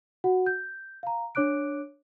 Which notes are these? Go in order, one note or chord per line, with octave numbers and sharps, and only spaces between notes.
F#4 F#5
G6
F5 A#5
D4 C#5 D6 F#6 D7